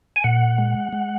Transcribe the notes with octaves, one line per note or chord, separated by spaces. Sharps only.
G#5
A#2 F#5
G#3
G#3